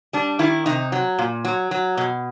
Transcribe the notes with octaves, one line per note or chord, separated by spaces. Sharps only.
G3 D4
D#3 E4
C3 D#4
F#3
A#2
F#3
F#3
B2